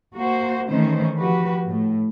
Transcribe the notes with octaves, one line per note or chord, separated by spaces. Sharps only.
A#3 F#4 C5
D#3 E3 A3 C#4 C5
F3 F#4 G4 B4
A2